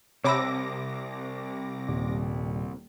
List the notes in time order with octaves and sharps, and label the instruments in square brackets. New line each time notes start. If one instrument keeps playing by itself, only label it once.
[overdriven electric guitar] C2 [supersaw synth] C3 D6 A#6 [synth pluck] C#5 B5 E6
[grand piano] D#1